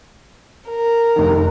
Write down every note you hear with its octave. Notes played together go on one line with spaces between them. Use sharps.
A#4
F1 D#3